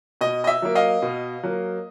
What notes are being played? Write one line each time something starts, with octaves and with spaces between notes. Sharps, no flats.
B2 D#5
D#5
E5
F#3 A#3
D#5 F5
B2
F#3 A#3